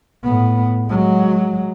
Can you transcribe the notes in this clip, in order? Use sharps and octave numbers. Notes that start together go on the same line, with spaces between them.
A2 B3
F#3 G#3